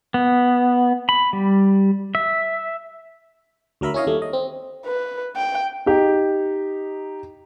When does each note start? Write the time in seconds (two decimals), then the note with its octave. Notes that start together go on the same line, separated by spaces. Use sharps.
0.14 B3
1.09 B5
1.33 G3
2.15 E5
3.81 D2 F#3 A#4 E5 B5
3.94 C#4 E4 C#5 D#5 F5
4.07 D#2 G3 A3
4.22 D#5
4.33 C4
4.86 B4
5.36 G5
5.86 D#4 G4